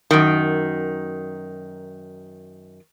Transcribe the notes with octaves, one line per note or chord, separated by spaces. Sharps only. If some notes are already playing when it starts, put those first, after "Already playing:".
F#2 D#3